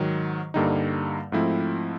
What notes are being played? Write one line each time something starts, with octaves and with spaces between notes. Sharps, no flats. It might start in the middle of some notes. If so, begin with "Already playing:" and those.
Already playing: G#2 D#3 F#3
G2 D3 G3 A#3 D#4
G#2 F3 A3 C4 E4